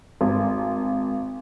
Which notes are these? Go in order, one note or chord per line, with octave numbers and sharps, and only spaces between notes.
G#1